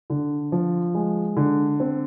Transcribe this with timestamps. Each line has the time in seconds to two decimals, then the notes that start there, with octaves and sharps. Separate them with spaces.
0.10 D3
0.52 F3
0.95 G#3
1.36 D3
1.80 C4